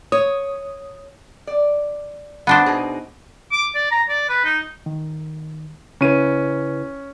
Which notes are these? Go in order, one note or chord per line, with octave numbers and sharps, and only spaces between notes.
C#5 D#6
D5
B3 D4 C5
B2 D#4 G#4
D6
D5
A#5
D5
B4
D#4
D#3
C#3 C#4 E4 B4 D#7